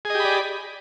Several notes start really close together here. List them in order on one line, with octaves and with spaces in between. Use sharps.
G#4 D#5 G4 B5 D5